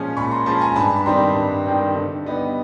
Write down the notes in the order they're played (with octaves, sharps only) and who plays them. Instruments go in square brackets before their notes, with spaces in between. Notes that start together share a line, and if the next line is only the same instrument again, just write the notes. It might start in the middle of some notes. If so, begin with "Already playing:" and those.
Already playing: [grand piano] A#2 F3 G#3 C#4
A#2 B5 C#6
A#5 C6
F3 G#3 C#4 A5 B5
G#5 A#5
G2 A5 B5
B5
D#3 G3 C4 A#5 C6
G2
D#3 G3 C4
D3
G3 B3 D#4